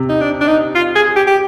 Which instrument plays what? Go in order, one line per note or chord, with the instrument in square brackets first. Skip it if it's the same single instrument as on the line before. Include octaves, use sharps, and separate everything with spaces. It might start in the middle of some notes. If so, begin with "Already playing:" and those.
Already playing: [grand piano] C3
[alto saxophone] D#4
D4
D4
D#4
F4
G#4
G4
G4